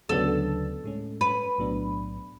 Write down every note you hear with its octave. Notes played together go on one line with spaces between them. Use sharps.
D2 C#3 F#3 B3 D4 A4
A2 G#3 C#4
B4
B1 A2 F#3 B3 D4